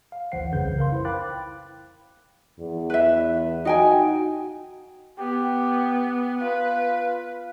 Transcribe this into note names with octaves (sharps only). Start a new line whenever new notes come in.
F5
G#1 D2 E3 C5 F#5 C7
C2 F2 C#3 B4 G6
A#4 B4 F5 C6
E4 C5
F5 G5 B5 D6 F#6 A6
E2
B4 E5
D#4 F#4 G5 G#5
B3 G4
F4 B4